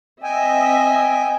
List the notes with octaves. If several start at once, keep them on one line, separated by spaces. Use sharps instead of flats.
C4 D#5 E5 G5 G#5